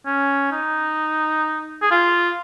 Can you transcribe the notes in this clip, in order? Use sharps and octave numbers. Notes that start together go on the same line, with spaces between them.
C#4
D#4
G#4
F4